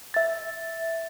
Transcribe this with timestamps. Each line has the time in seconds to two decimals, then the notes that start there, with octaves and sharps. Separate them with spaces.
0.14 E5 A6